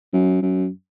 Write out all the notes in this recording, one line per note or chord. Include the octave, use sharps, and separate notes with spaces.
F#2
F#2